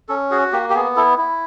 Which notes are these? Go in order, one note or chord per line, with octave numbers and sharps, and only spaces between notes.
C#4 A4
F#4 G#4
A#3 G4
G4
B3 G#4
E4 A4
E4